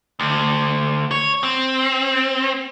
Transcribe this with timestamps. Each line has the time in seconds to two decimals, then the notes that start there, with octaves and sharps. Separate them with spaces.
0.20 D2
1.11 C#5
1.43 C4